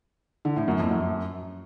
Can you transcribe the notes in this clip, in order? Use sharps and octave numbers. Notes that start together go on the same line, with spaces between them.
D3
A2
F#2
F2
F#2